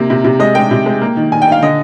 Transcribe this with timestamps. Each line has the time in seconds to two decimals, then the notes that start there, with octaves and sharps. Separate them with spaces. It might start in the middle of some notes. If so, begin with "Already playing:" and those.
Already playing: C3 A#3
0.10 C3
0.25 C3
0.40 G#3 D#5
0.55 G#3 G5
0.71 C3
0.86 G#3
1.01 A#3
1.17 D#3
1.32 D#3 G#5
1.42 G5
1.47 D#3 F5
1.63 D3 D#5